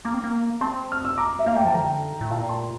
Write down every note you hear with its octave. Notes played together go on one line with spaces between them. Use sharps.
A#3 A#5 D6
C4
A#3
C4 A5 C6
F6
E6
A#5 D6
E5
A#3 F5
A3 G5
F3 A5
D3 G5 A#5
A2
A#2 F5 A5
G5 A#5
A5 C6